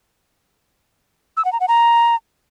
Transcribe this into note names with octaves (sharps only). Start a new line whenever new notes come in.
E6
F#5
A#5
F#5
A#5